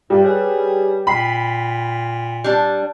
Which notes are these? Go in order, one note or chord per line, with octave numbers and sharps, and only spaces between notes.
G2 G3
G#4 B4 C#5
A#2 G5 B5 B6 C7
G3 D4